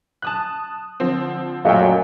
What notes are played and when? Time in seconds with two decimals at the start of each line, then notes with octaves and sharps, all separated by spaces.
0.22 A5 D#6 F#6
1.00 D3 F3 C4
1.65 F#2 A#2 A3 D#5 F5 G5